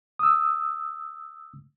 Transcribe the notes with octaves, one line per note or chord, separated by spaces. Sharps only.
D#6 E6